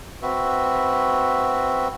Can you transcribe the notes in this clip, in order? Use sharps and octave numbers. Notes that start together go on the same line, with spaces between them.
C4 F#4 B4 E5